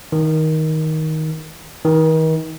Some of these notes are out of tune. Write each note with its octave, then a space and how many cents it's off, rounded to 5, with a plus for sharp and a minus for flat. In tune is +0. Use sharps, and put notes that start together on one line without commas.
D#3 +15
D#3 +40